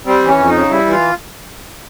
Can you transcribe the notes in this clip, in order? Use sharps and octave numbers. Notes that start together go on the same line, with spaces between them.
G3 C4
E3
C#4
F2
D#4
C#3
G3 E4
E3
F4